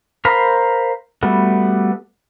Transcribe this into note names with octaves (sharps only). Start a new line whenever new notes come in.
A#4 C5 F5 A#5 B5
G3 A3 B3 F#4